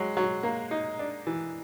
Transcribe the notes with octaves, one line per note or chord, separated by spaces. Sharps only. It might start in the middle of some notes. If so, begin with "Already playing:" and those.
Already playing: F#3 G#3
F#3
A#3
D#4
D4
E3